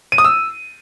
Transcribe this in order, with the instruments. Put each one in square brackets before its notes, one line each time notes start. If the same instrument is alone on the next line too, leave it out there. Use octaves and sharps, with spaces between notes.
[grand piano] D#7
D#6
E6